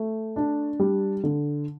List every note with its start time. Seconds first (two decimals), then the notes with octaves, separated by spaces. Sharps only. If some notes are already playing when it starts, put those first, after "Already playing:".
Already playing: A3
0.36 D4
0.80 G3
1.24 D3